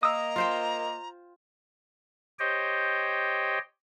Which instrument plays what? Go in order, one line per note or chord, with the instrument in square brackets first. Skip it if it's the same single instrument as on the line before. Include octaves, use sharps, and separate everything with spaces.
[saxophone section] A#3 D#5 [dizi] A#5 [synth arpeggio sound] D#6 E6
[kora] F4 C5 G5
[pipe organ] G4 C5 C#5 D#5 G5